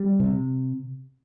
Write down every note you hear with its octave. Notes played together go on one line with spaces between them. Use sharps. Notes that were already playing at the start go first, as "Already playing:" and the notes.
Already playing: G3
C3